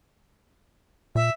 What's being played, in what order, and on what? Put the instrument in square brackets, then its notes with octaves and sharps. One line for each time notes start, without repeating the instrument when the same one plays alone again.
[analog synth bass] A#2 [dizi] E5